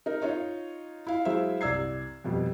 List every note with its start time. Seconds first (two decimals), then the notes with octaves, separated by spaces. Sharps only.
0.06 D#4 A#4
0.21 D#4 F4 C#5 D#5
1.07 E4 F5
1.25 F#3 G#3 E4 C5 E5 F5
1.61 C2 D5 E6 G#6 C7
2.24 F2 B2 G3